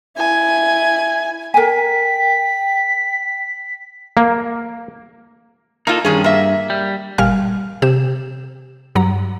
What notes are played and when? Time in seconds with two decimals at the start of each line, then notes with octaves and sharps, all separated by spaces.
0.17 E4 G#5
1.54 A#4 G5 G#5 B6
4.17 A#3
5.87 A#3 D#4 F4 A4
6.05 G2 D#3 C#4 G#4
6.24 A#3 E5
6.70 G3
7.18 G1 A#2 G3 F5 G#5 F6
7.82 C3 G4 E7
8.95 G2 F#3 A#5